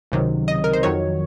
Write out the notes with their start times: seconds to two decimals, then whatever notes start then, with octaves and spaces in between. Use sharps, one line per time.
0.12 C#2 C3 D#3 F#3
0.48 D#5
0.64 A#4
0.73 C5
0.83 F2 D#3 F#3 C#5